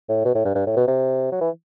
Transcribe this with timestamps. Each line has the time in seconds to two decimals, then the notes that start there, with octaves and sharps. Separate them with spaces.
0.09 A2
0.25 B2
0.35 A2
0.45 G2
0.55 G2
0.67 A2
0.77 B2
0.88 C3
1.32 F#3
1.41 E3